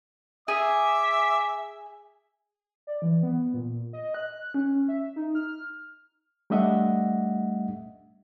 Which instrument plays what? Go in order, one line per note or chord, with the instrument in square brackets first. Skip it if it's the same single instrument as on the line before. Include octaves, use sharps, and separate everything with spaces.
[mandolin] G#4 [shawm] E5 [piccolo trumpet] D6
[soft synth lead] D5
E3
B3
A#2
D#5
F#6
C#4
E5
D#4
F6
[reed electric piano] G3 A3 D4 D#5 E5 F#5